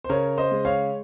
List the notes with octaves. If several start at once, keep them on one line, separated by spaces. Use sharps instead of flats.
C5
C#3 A#4 C#5
C5 D#5
G#3
C#5 F5